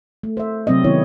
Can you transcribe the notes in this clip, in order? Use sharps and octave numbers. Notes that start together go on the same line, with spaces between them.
A3
C5 E5
C3 F#3 C4 D5 D#5
D#3 B3 E4 C#5